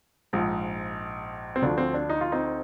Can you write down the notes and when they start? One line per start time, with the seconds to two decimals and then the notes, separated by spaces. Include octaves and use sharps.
0.33 A#1 G#2 F3
1.56 C4
1.62 D2 D3 F3 D4
1.78 C4
1.94 D4
2.10 D#4
2.21 F4
2.32 C4 D#4